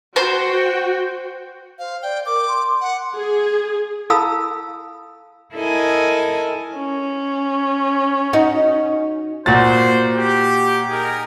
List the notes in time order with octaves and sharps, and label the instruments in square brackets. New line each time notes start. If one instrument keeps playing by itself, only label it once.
[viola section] F#4 G5 [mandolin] C5 C6
[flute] C5 [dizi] F5
[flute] D5 [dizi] G5
[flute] A#4 [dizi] D6
[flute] C6
[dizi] F#5
[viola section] G#4
[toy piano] E4 A4 F5 A5 B5 E6
[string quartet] E4 A4 A#4 D#5 G#5
[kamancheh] C#4
[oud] D#4 F#4
[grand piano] A#2 F#4 A6 [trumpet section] C5
[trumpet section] G4
D#4 G#4 A#4